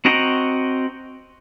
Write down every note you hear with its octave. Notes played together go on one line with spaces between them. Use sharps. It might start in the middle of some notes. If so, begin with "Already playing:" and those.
C4 F#4 D#5 G5 A#5